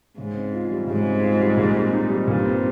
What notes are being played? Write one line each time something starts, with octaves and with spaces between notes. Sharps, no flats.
G#2 C#3
C4
F4
G3
G#2 C#3
C4
F4
G3
A#2
C4
D#4
G3
G2 A#2
C4